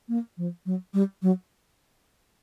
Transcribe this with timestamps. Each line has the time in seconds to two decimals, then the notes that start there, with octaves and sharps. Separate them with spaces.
0.09 A#3
0.38 F3
0.66 F#3
0.94 G3
1.22 F#3